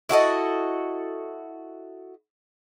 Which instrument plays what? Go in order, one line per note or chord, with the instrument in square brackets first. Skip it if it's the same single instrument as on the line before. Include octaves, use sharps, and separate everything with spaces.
[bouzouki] E4 F#4 A4 D#5